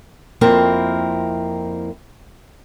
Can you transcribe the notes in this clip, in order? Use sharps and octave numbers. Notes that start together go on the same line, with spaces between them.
F2 A#3 C4 E4 A#4